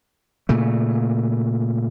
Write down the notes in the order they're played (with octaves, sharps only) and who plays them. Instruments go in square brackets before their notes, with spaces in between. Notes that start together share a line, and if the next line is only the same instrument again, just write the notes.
[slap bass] A#2 C#3 A3